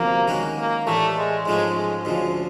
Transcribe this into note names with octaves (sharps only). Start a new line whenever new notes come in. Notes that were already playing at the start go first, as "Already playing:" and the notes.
Already playing: D2 C3 F3 A#3 B3
D#3 G#3 C#4 F#4
A#3
A2 E3 G3 A3
G#3
G#2 F3 G#3 A3 C#4
G#3
D2 C#3 F3 G#3